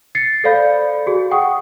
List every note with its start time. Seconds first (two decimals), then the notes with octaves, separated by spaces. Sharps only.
0.15 A6 C7 C#7
0.44 A4 C5 D5 F5 B5 G6
1.07 F#4 G#4
1.31 F#5 G5 C#6 D#6